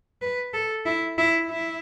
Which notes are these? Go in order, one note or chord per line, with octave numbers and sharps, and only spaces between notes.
B4
A4
E4
E4
E4